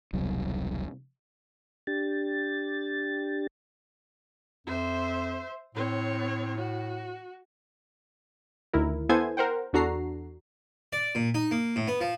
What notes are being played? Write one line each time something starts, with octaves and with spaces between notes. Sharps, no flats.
E1 C2 F#3
D4 G4 A6
F2 C5 E5
A2 C4 C#5
F#4
D2 D#3 E4 A#4
B3 E4 A4 C5 G#5 G#6
A#4 C5 F#5 G5
E2 D4 F#4 A4 A#5 C7
D5
A#2
D#4
A#3
A2
B3
F3